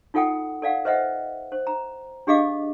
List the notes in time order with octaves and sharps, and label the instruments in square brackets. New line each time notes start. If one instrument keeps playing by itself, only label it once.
[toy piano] D#4 F4 A4 F#5 G5 D#6
A4 D5 F5 F#5
B4 C5 D#5 E5 F#5
C5
A#5
D4 G4 G#4 D#5 F5 D6